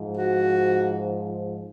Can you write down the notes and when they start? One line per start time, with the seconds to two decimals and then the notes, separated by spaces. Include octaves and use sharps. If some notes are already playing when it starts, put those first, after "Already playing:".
Already playing: G#2 F3
0.16 F#4